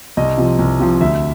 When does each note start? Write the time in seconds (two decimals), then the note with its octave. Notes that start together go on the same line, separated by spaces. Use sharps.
0.17 C2 D#5
0.38 C3 F3
0.59 C2
0.80 C3 F3
1.01 D2 E5